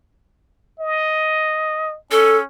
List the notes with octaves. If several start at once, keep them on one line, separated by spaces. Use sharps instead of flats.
D#5
C#4 A4